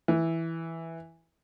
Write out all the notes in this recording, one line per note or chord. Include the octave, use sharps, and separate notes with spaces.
E3